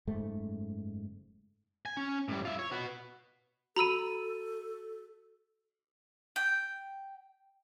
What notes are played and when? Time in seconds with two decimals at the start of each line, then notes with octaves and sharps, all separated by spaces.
0.07 F#1 G#2 A3
1.86 G#5
1.97 C#4
2.29 A2 G3
2.45 F4 E5
2.59 C#5
2.72 F#4 B4
3.76 F#4 A4 A#5 B5 E6 D#7
6.36 G5